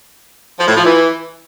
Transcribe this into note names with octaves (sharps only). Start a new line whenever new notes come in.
F3
A2
F3
E3